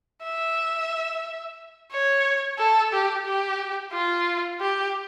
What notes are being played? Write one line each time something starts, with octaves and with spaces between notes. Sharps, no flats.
E5
C#5
A4
G4
G4
F4
G4